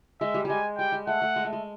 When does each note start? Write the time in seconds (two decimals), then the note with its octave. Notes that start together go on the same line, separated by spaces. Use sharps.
0.21 G#3 E5
0.34 G3
0.45 G3 G#3 G#5
0.78 G3 G5
0.92 G#3
1.07 A3 F#5
1.22 A3
1.36 G#3
1.45 A3
1.53 G#3